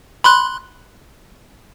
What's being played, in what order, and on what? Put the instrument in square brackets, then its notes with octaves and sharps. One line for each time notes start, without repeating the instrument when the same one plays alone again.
[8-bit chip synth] B5 C6 F#6